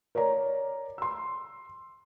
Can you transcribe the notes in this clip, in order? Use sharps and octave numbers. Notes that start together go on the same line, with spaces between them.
A#4 C#5 D5 A#5
C6 E6